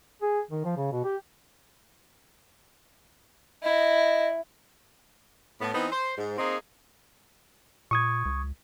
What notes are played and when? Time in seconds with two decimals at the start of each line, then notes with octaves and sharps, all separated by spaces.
0.22 G#4
0.51 D#3
0.65 F3
0.77 C#3
0.92 B2
1.05 G4
3.63 E4 D#5
5.61 A2 B3
5.74 E3 B3 C4 D#4
5.92 C5
6.18 G#2
6.38 A#3 C4 D#4 G#4
7.91 A#2 C#6 D#6 G#6
8.26 C#2